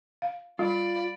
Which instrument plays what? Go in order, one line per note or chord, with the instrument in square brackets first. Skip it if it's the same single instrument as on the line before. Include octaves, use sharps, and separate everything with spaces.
[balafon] F5
[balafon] G3 [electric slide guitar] F4 [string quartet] D5 B5